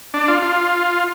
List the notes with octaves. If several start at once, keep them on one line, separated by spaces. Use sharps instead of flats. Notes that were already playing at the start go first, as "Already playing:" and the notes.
D4
F4
F4